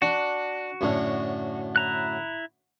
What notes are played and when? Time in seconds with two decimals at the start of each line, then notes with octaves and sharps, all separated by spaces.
0.02 D4 F#4
0.81 F#2 A2 D3
1.76 E4 A#5 F#6